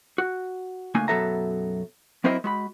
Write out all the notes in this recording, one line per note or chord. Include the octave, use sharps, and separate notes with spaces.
F#4
C#2 A3 A#3 D4 G#5
F#2 B2 F#3 A4 E5 A#5
F#3 C4 E4 A#4 C5 D#5
G#3 F#4 B5